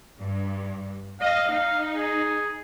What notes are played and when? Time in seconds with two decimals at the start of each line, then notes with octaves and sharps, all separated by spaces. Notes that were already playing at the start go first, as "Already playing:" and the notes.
0.19 G2
1.21 D#5 F5
1.51 D#4 F5
1.96 G#4